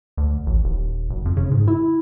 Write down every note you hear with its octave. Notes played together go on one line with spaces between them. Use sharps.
D2
A1
D#1
F#1
F2
C#3
G#2
E4